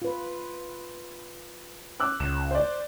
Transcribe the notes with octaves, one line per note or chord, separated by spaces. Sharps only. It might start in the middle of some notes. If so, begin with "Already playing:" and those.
F4 B4
D6 E6 F#6
C#2 E7
C5 D5